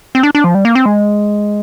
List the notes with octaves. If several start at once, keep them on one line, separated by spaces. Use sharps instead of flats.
C4
D4
D4
F3
G3
A#3
C4
G#3